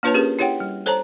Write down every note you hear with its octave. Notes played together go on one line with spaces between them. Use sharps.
A#3 D4 F4 B4 C#5 A5
C#4 G4 G#4 A#4 B4
E4 G4 C#5 F#5 G5
G3
A4 C5 C#5 A5 A#5